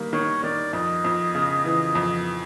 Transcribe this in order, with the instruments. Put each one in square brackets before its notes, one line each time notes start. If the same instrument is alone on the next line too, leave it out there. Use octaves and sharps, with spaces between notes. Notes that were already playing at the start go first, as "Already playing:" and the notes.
Already playing: [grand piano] D#3 G3 A#3
[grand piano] D#3 [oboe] C#5
[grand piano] D#3 [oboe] D5
[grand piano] F2 [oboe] D#5
[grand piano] F2
C#3
E3
F2